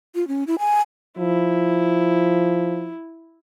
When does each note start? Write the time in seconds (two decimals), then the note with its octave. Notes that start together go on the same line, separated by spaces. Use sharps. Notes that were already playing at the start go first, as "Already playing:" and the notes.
0.15 F4
0.28 C#4
0.47 E4
0.59 G#5
1.18 F3 E4